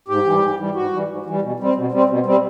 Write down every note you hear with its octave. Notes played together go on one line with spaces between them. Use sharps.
G#2 G4
E3 G3
G#2
E3 G3
G#2 F#4
E3 G3
G#2
E3 G3
B2
G3 C4
B2
G3 C4
B2
G3 C4